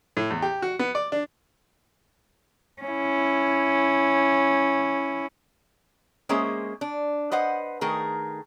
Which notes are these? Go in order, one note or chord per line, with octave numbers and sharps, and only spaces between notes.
A2
E2
G4
F#4
B3
D5
D4
C#4 E4
G#3 A#3 C#4 G#4 C5 E5
D4
B4 C5 D#5 F#5
D#3 A3 G#4 A#4